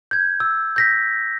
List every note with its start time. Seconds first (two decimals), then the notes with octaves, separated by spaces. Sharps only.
0.11 G6 G#6
0.40 E6
0.76 G6 A#6 B6